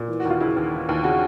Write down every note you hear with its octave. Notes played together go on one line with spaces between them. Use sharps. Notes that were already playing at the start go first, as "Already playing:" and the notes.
Already playing: A#2
E3
F#4
D#2
F4
C#3 E4
D#2
E3
D#2
C#3 F#4